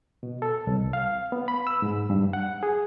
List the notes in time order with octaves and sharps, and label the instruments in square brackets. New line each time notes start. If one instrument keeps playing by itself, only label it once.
[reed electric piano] B2
A4
C2
F5
B3
B5
E6
G#2
G2
F#5
G#4